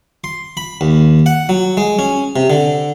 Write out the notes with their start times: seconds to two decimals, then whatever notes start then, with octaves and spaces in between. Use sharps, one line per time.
0.24 C6
0.57 B5
0.81 D#2
1.26 F#5
1.49 F#3
1.77 G#3
1.99 C#4
2.36 C3
2.50 D3